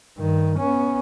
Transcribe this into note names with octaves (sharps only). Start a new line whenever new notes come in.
G2 D#3
B3 C#4